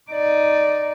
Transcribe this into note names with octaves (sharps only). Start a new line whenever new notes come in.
D#4 D5